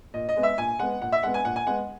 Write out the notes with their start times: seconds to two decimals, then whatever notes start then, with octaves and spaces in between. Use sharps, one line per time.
0.14 A#2 D#5
0.29 D#5
0.36 G#3 B3
0.43 E5
0.58 A#2 G#5
0.79 G#3 B3 F#5
1.02 A#2 F#5
1.12 E5
1.23 G#3 B3 F#5
1.34 G#5
1.45 A#2 F#5
1.56 G#5
1.67 G#3 B3 F#5